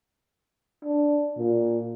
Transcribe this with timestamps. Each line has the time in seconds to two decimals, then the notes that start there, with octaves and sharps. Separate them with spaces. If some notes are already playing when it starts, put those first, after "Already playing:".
0.85 D4
1.38 A#2